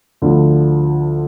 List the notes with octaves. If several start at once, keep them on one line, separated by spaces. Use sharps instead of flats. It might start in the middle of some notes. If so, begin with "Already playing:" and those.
D2 D3 F3